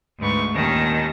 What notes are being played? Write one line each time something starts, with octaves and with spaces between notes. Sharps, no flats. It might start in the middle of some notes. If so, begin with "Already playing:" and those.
D2 G#2 B4 C#6
D#2 A#2 D#3 C#4 A5 A#6